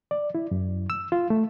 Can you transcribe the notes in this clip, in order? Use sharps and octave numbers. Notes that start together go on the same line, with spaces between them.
D5
E4
F#2
E6
F4
A3